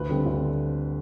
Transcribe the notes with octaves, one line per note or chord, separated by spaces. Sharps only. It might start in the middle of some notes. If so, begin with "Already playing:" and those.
Already playing: D2 B4
D3 G3 C4
D2